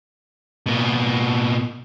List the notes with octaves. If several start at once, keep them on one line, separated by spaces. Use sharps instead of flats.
B2 A#3